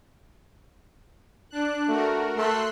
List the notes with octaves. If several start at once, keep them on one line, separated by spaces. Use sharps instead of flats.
D4 F#6
A3 F#4 A#4
A3 C6 E6 F#6